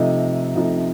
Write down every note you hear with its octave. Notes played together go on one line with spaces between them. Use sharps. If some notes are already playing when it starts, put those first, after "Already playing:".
Already playing: C3 F3 A3 D#4 D#5
C3 F3 A3 D#4